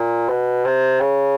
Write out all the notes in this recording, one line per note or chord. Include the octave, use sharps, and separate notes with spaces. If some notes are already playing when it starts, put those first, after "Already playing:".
Already playing: A#2
B2
C3
C#3